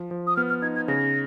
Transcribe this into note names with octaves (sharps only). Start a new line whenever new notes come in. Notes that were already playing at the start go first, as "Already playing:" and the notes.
Already playing: F3
F3
D#6
B3 F6
F6
D#4 G#6
G#6
C#3 A#6